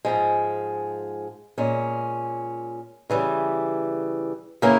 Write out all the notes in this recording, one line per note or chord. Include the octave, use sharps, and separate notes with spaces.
G#2 F3 G#3
A#2 G#3 C#4
C#3 E3 G3
C#3 E3 A#3 C#4 E4